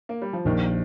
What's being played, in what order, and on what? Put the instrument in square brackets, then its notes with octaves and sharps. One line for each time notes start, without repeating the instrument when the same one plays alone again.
[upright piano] A#3
G3
F3
[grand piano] A#1 [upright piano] D#2 D#3